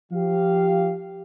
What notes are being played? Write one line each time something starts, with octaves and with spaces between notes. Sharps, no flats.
F3 G4 F5